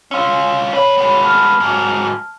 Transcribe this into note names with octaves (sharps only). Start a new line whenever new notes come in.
C#4 F4 C6 E6 C#7
D4 B4 C#5
G#3 B3
A5 C#6 F6
G#2 F#3